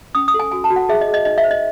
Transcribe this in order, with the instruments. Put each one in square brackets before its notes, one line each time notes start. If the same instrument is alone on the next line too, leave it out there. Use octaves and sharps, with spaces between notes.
[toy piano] C#4 D#6
D#6
A4
G#5
F#4 G#5
A5
F#4
F#5
G#4 E5
D#5
G#4
D#5
D#4 D#5
E5
C5
D#5